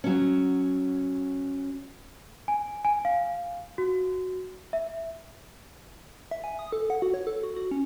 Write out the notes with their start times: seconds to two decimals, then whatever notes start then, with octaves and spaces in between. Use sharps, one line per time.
0.04 F#3 C#4
2.48 G#5
2.85 G#5
3.05 F5
3.78 F#4
4.73 E5
6.31 E5
6.44 G#5
6.59 D#6
6.72 A4
6.90 F#5
7.02 F#4
7.14 C#5
7.27 A4
7.43 F#4
7.56 F#4
7.71 C#4